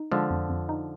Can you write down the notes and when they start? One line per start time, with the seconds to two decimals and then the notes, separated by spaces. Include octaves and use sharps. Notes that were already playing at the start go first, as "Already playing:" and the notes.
Already playing: D#4
0.12 D3 F3 G#3
0.31 F2
0.49 F2
0.69 D#4